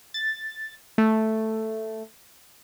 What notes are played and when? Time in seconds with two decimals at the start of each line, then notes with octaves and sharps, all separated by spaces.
0.14 A6
0.98 A3